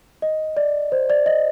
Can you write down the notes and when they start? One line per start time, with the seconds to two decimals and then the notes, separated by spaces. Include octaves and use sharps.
0.22 D#5
0.57 D5
0.92 C5
1.10 D5
1.26 D#5